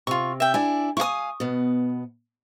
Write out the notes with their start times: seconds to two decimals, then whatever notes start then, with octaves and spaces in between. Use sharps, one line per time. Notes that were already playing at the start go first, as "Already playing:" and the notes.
0.07 C3 F4 C#6
0.40 E5 G5
0.54 D4 E4 D5 G#5
0.97 E4 F5 G#5 C#6 D#6
1.40 B2 B3